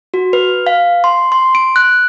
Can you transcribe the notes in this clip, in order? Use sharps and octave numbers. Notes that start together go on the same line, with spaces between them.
F#4
B4
F5
C6
C6
D7
F#6